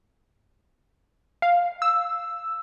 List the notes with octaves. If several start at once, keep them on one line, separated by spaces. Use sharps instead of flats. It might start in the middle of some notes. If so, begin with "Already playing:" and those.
F5
E6